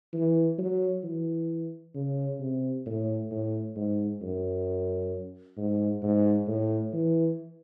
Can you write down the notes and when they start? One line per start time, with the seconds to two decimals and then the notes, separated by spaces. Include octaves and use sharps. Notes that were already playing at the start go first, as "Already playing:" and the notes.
0.14 E3
0.58 F#3
1.04 E3
1.95 C#3
2.40 C3
2.86 A2
3.31 A2
3.76 G#2
4.22 F#2
5.57 G#2
6.03 G#2
6.48 A2
6.94 E3